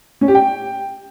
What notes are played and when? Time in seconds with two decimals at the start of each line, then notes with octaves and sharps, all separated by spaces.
0.21 C#4
0.28 G4
0.35 G5